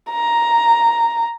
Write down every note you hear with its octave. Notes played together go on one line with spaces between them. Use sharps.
A#5